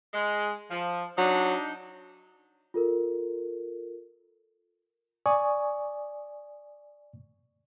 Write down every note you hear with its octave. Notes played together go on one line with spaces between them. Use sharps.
G#3
F3
F#3 D4 D#4
F4 A4 A#4
D5 G#5 C#6 D#6